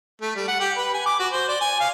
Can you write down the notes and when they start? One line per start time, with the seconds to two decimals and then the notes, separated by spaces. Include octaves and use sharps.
0.21 A3
0.36 G3
0.48 F#5
0.60 G4
0.77 B4
0.93 G#5
1.06 D6
1.19 F#4
1.32 C5
1.48 D5
1.61 G#5
1.80 F5